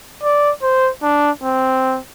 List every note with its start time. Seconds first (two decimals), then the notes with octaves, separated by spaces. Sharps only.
0.23 D5
0.62 C5
1.03 D4
1.43 C4